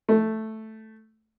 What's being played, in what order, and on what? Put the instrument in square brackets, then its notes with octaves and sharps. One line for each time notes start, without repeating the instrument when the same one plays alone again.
[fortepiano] A3